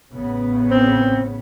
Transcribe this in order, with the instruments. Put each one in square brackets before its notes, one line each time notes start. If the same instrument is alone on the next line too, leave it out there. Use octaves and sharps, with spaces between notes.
[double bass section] A1 C#3 B3
[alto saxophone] C4